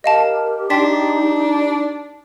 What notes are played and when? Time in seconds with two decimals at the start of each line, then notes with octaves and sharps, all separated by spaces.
0.04 G4 A#4 D#5 F5 A5
0.70 D4 D#4 G5 C6 B6